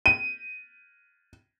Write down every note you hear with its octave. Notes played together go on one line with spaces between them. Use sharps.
D#7